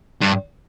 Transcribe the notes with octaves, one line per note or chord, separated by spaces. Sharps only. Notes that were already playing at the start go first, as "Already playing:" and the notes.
G2